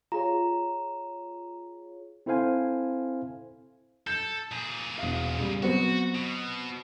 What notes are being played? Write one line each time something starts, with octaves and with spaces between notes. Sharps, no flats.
F4 G#4 C#5 A#5
C4 E4 A4 C5 F5 G#5
A4 G6
A#2 G#4
E1 F5
C#3 G3
F#3 B3 C4 F#4
B2